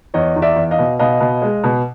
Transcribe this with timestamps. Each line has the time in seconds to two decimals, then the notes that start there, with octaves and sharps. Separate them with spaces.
0.14 E2 C#5 D#5
0.36 E2
0.42 D5 E5
0.56 E2
0.71 D#5 F5
0.79 B2
0.99 B2 D#5 F5
1.20 B2
1.42 G#3
1.64 B2